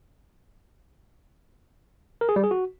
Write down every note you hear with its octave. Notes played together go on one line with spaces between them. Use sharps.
A#4
G#4
G3
G#4
F#4